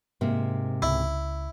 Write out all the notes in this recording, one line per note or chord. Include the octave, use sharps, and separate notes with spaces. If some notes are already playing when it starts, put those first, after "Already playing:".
G#2 C3 A#3
C#2 E4